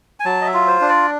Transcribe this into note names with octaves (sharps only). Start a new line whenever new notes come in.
G#5
F#3 A5
D#5
E5
F4
C5
D4
D5